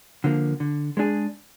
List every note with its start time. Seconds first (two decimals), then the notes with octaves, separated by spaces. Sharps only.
0.24 D3 F3 A#3
0.60 D3
0.97 G#3 D4 G#4